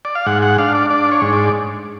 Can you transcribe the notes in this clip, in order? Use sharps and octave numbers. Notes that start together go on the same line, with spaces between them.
D5
F5
G#2 F#5
F#5
D4 F5
D5
D4 D5
C#5
G#2
D5